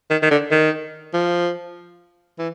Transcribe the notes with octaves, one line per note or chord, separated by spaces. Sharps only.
D#3
D#3
D3
D#3
F3
E3